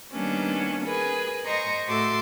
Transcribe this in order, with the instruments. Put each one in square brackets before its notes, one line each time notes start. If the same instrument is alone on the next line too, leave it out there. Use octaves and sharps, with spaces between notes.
[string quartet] D#3 G3 A#3 B3 C#4 D4
G#4 A#4 B4 G#5
C5 D#5 A#5 C#6
A2 F#4 A4 E5 C6 D6